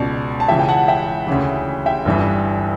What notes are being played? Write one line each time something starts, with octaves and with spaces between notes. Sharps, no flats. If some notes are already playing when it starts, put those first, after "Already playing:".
Already playing: C#2 B2 D5
A5
C#2 C#3 E3 E5 G5
G5
F#5 A5
E5 G5
D2 C#3 E3
E5 G5
G1 G2 E3